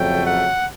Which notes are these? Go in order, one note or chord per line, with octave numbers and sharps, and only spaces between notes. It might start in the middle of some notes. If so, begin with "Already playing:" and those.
Already playing: F2 C#3 F#3 A3 G5
F#5